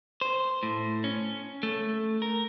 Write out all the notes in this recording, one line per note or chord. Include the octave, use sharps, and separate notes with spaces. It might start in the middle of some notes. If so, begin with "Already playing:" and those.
C5
A2
C#4
A3
A#4